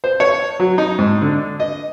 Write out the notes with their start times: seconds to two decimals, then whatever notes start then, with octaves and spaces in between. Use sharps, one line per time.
0.04 C5
0.20 C#5
0.60 F#3
0.78 D#4
0.99 G#2
1.22 D3
1.60 D#5